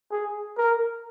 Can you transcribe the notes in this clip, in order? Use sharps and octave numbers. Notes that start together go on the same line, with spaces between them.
G#4
A#4